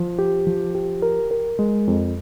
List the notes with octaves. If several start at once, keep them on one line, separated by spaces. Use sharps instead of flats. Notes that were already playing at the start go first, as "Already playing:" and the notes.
Already playing: F3
G4
F3
G4
A#4
A#4
G#3
F2